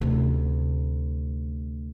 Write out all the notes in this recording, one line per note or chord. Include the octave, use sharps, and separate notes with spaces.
D2 C3